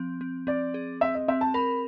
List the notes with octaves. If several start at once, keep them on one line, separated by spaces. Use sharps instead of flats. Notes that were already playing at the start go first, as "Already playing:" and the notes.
Already playing: F3 C4
C4
C4 D5
G#4
C4 E5
D#5
C4 E5
A5
A#4 B5